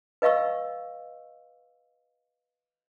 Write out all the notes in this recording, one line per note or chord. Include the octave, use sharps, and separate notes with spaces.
B4 D#5 F5 C#6 E6